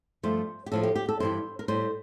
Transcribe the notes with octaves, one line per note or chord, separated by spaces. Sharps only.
G2 F3 A3 C5
G4
A2 F3 A3 A4
G4
G4
A4
G2 E3 G3 C5
A#4
A2 G3 C5